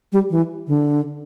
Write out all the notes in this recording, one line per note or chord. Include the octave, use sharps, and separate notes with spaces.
G3
E3
D3